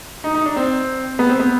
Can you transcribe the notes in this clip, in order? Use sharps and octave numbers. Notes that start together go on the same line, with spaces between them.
D#4
D#4
D4
C4
B3
C4
B3